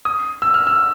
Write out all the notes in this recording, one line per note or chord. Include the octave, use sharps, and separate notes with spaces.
D#6
E6
F6
E6